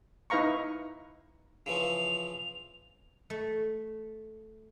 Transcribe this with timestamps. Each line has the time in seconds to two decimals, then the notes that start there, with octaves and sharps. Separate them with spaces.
0.30 D#4 E4 B4 F5 A#5 C#6
1.66 C#3 E3 F3 F7
3.30 A3